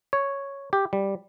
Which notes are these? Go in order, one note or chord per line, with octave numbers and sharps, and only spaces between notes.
C#5
G4
G3